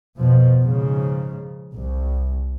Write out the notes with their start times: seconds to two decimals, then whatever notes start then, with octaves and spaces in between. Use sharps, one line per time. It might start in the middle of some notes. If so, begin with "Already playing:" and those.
0.18 F2 B2 F3
0.62 G#2 C#3 F3
1.75 C2